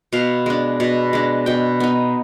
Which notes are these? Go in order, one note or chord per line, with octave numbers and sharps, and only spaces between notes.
B2 F5
G#3 D4
B2
G#3 D4
B2 G5
B3 D#4